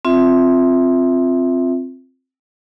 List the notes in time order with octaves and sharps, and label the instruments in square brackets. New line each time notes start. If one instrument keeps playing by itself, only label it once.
[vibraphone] C4 F4 E5